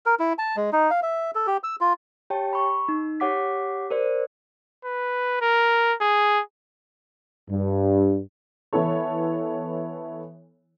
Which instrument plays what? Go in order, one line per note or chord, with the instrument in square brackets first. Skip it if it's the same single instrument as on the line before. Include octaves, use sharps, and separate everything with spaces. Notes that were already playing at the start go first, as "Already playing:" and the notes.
[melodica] A#4
E4
A5
G#3
D#4
F5
E5
A4
G4
E6
F4
[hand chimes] G4 C#5 G5 A5
B5 C#6
D#4
G4 C#5 F#5 D6 B6
A#4 C5 D5
[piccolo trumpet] B4
A#4
G#4
[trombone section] G2
[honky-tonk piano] E3 B3 E4 A4 C#5